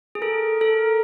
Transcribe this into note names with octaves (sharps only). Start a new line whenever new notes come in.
G#4
A4 A#4
A4